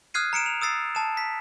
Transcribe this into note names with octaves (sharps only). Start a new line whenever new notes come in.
D#6 F6 F#6 G#6 C7 D#7
A#5 C#7 D7 E7
F7
D#6 E6 A6 C7
A5 E7
B6